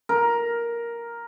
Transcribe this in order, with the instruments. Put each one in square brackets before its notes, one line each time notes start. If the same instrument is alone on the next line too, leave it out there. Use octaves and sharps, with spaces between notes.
[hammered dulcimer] A#4